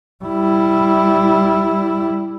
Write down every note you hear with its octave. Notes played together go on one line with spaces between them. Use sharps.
G3 E4